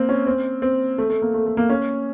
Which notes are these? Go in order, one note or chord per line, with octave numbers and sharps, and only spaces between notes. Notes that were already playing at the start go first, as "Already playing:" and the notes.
Already playing: A#3 C4
C#4
C4
C4
A3
A3
A#3
A3
A3
A#3
C#4